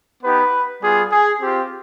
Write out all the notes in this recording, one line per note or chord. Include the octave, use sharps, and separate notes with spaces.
B3 D#4 G4 B4
G3 B3 F4 G#4
G#4
C4 F4 G4